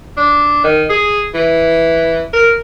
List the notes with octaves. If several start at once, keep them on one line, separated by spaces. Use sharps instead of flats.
D4
D#3
G#4
E3
A#4